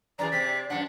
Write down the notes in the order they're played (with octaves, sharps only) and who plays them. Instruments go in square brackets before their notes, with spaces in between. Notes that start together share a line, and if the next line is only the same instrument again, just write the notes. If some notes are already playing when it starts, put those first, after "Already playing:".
[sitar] F#2 E3 G#4 [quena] D5 [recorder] A#5
[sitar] C3 C4 [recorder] B6
[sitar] F#2 A#2 D4 [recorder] F#5